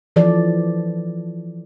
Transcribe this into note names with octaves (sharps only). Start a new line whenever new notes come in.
E3 F3 A4 D5